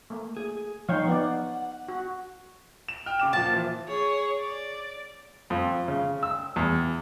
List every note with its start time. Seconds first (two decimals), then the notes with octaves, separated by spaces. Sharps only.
0.10 A3 A#3
0.37 G#4
0.89 F3 D#4 C#5 F5 G5
1.08 B3 D#4 D5 F#5
1.88 F#4
2.89 E7
3.06 G5 F6
3.20 C#3 D6 E7
3.33 A#2 F3 A5
3.53 E3
3.88 G#4 C#5
4.39 D5
5.50 F2
5.88 C#3
6.23 E6
6.56 E2